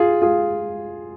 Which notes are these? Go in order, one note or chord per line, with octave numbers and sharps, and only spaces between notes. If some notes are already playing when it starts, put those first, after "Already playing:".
Already playing: F4 G#4
F4 G#4